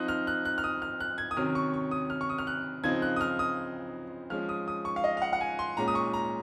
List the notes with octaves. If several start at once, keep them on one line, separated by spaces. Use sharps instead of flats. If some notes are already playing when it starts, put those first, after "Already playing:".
Already playing: F3 C4 D#4 F#6
F6
F#6
F#6
F6
D#6
F6
F#6
G#6
D#6
C3 D#3 F#3 C#4 F6
C#6
C#6
D#6
F6
C#6
D#6
F6
F#6
C#3 F3 C4 D#4 G#6
F#6
D#6
F6
D#6
F3 G#3 C#4 F6
D#6
D#6
C#6
F5
D#5
F5
F#5
F#5
G#5
C6
A#2 G#3 C#4 A#5
D#6
C#6
A#5